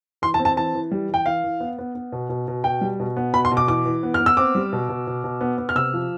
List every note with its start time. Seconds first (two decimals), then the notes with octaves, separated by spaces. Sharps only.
0.22 E3 C6
0.34 A5
0.39 C4
0.45 A5
0.56 E3 A5
0.75 E3
0.91 G3
1.09 E3 G5
1.25 E3 F5
1.44 E3
1.60 B3
1.78 B3
1.95 B3
2.12 B2
2.29 B2
2.48 B2
2.64 B2 G5
2.81 G3
3.00 B2
3.17 B3
3.33 B2 B5
3.45 C6
3.51 B2
3.57 D6
3.68 E3 D6
3.85 E3
4.03 B3
4.14 F6
4.20 B3
4.26 E6
4.37 C4 D6
4.55 G3
4.73 B2
4.89 B2
5.07 B2
5.24 B2
5.41 B3
5.58 B3
5.69 F6
5.75 C3 E6
5.94 F3